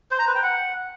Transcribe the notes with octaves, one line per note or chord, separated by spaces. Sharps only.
C5
A#5
B4
G5
F#5